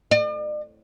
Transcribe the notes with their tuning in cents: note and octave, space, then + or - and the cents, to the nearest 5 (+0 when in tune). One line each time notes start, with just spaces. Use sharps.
D5 +45